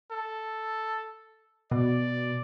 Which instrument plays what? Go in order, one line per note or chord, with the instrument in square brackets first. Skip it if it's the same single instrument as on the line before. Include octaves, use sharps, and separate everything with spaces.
[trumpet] A4
[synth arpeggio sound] B2 [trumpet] D5